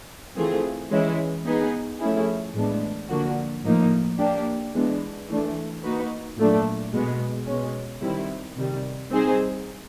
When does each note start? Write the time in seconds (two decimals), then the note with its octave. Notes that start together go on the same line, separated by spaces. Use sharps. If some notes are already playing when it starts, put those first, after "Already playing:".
0.36 E3 A3 C4 F4 G#4
0.91 E3 G#3 C#4 E4
1.46 B3 D#4 G#4 B4
2.00 F3 A3 C#4 E4 G#4
2.55 A2 E3 G#3 B3 D4
3.09 D3 F3 A#3 D4 F#4
3.64 A2 F3 A#3 D#4
4.19 A#3 D4 G4
4.74 E3 G#3 B3 D4
5.29 E3 A3 D4
5.83 A#3 D#4 F#4 B4
6.38 A#2 F#3 A3 D4
6.93 B2 G#3 B3
7.47 B2 G#3 C#4
8.02 D#3 G3 C4 E4
8.56 C3 D#3 G3
9.11 G3 C4 D#4 G#4 C5